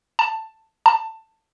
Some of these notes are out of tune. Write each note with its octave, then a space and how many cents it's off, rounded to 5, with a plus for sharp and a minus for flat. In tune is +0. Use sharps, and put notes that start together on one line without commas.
A5 +10
A5 +15